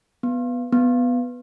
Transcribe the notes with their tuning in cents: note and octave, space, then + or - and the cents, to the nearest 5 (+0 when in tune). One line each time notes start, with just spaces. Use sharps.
B3 +0
B3 +5